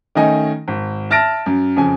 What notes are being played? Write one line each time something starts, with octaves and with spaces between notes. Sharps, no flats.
D#3 A3 C#4 D#4 D#5 G#5
G#1
E5 A5 F6 A6 A#6 D7
F#2
F2 C#3 G#5